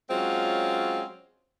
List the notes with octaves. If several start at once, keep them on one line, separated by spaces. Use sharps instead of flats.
F#3 G#3 C4 C#4 F4